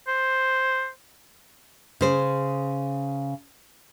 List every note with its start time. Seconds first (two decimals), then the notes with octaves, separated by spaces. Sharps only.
0.08 C5
2.01 C#3 C5